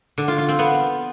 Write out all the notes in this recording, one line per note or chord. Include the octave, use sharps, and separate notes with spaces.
D3
F4
F4
C4
B3